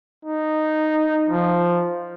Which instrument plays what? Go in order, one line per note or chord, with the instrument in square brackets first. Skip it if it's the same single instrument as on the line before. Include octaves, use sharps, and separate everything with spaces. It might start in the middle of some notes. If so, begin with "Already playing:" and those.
[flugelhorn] D#4
F3